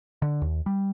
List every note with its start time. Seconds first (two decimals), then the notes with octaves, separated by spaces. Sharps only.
0.22 D3
0.42 D#2
0.66 G3